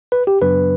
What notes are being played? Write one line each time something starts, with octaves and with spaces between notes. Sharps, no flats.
B4
G4
F#2 C#3 F#3 B3 D4 B4